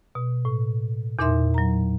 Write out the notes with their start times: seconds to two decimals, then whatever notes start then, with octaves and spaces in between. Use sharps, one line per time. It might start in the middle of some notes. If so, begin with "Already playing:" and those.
0.15 B2
0.45 A2
1.19 E2 A#2 D#4 A#4 E5 C6
1.54 F#3 A#5